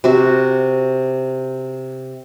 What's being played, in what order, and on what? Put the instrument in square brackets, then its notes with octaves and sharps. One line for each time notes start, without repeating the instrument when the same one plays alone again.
[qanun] C3 F#4